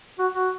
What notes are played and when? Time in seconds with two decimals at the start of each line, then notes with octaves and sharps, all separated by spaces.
0.19 F#4
0.34 F#4